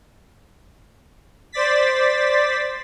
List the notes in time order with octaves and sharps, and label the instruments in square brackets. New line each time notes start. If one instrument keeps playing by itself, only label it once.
[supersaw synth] C5 D5 A6 B6